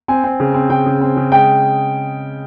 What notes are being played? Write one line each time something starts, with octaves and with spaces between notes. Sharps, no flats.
C4 G#5
C4
C#3
C4
C#3 G5
C#3
C4
C#3
G#3 G5